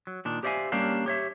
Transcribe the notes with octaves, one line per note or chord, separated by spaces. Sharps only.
F#3
A#2 D#3 D4
G4 C5 D5 E5 F5 G#5
G3 A#3 C#4 D4 G4 F5
G4 C#5 E5